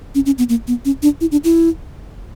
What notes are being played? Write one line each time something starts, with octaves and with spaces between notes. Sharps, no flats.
C#4
C#4
B3
A#3
B3
C#4
D4
E4
D4
E4